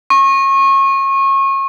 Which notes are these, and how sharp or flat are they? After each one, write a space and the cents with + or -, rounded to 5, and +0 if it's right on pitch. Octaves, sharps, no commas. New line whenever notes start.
C#6 -30